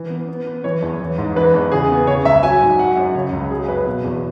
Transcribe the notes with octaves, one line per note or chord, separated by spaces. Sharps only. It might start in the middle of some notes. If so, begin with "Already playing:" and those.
Already playing: E3
B3
B3
B3
E3 C#5
E2
E3
G#2
E3 B4
E2
C#3 G#4
B3
C#3 C#5
C#2 E5
F#3 G#5
G#2
F#3 F#5
F#2
C#3 C#5
C#2
F#3 G#4
F#2 B4
B2
E2